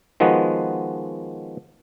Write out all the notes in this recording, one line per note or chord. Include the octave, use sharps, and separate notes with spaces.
D#3 F3 G#3 B3 F#4